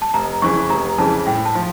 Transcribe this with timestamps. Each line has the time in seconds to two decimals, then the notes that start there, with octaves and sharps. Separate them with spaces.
0.02 A5
0.14 F1 A#5
0.42 F2 C#3 E3 C#6
0.70 F1 A#5
0.98 F2 C#3 E3 A5
1.27 A2 G5
1.45 A5
1.55 F3